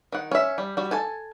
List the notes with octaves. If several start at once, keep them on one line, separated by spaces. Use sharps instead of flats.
D#3 F#5
C#4 E5
G3
G3 F#4
A4 G#5 A5